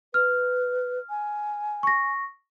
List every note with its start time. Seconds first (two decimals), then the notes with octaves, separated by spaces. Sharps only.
0.14 B4 F6
1.10 G#5
1.83 C#6 A#6